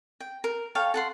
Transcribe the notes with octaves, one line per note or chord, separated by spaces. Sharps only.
G5
A#4
A4 C#5 F5 G5
A4 F#5 C6